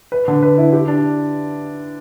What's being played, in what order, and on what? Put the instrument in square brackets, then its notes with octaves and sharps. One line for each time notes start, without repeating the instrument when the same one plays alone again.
[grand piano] B4
D3
B4
E4
G4
D4